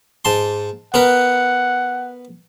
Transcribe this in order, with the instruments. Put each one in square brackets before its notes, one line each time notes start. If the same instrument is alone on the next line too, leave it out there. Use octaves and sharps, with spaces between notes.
[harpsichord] G#2 A5 C6
[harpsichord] B3 A#4 B4 [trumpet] F#5